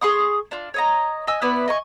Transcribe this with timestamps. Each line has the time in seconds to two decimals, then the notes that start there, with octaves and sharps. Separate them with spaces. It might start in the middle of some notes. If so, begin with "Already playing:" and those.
0.01 G#4 C6 C#6 D#6
0.51 D4 F4
0.74 C#5 D#5 A#5
1.27 D#5 G#5 E6
1.42 B3 E4 B4 D5
1.68 D#5 G#5 C#6